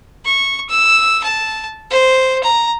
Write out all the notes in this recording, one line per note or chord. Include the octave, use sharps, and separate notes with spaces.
C#6
E6
A5
C5
A#5